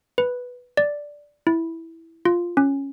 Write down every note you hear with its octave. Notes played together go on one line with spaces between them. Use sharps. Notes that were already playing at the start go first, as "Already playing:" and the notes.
B4
D5
E4
F4
C#4